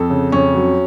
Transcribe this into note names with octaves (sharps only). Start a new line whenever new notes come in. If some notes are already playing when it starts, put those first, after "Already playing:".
Already playing: F2 A4
C#3
F2 C#4
F#3